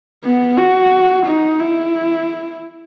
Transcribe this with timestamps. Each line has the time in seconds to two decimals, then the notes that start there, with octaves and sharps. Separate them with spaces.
0.24 B3
0.57 F#4
1.27 D#4
1.60 E4